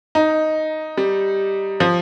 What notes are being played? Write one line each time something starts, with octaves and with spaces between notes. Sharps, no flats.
D#4
G3
F3